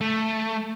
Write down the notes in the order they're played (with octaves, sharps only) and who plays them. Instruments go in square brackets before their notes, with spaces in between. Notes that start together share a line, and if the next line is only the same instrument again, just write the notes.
[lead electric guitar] A3